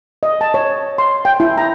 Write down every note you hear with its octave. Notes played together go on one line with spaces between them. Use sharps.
D#5
A5
C#5
C6
G5
E4
A#5